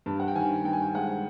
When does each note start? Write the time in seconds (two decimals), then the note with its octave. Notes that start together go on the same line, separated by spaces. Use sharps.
0.06 G2 A5
0.20 F#5
0.28 G5
0.35 D#3 G#5
0.64 G2 G5
0.73 G#5
0.82 G5
0.94 G#3 F#5